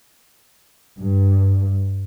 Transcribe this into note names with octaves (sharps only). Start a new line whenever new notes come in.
G2